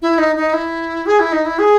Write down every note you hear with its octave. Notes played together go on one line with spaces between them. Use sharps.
E4
D#4
D#4
E4
G#4
E4
D#4
E4
G#4